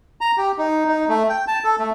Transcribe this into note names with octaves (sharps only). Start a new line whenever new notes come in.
A#5
G4
D#4
D#4
A3
G5
A5
A4
A3